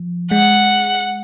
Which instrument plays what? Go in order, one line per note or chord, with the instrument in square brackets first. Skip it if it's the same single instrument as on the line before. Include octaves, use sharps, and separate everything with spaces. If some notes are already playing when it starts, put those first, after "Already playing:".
Already playing: [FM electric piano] F3
[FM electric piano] G#3 [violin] F#5